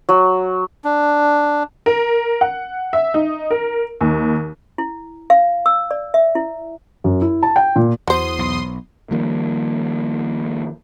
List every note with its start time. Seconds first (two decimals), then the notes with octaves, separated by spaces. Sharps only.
0.09 F#3
0.84 D4
1.86 A#4
2.41 F#5
2.93 E5
3.14 D#4
3.51 A#4
4.01 D#2
4.78 E4
5.30 F5
5.66 E6
5.91 D5
6.14 E5
6.35 E4
7.04 F#2
7.22 E4
7.43 A5
7.56 G5
7.76 A#2
8.08 E2 F#3 C5 C6 D#6
8.39 B1
9.11 D#3 F3 G3 A#3